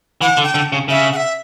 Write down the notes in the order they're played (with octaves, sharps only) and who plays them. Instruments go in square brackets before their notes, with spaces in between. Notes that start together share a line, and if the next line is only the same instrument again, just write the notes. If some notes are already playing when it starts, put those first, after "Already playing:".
[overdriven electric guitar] E3 [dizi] F#5
[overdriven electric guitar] D3
[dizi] G5
[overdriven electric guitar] D3
C#3
[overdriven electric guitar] C#3 [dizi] E5
[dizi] F#5
E5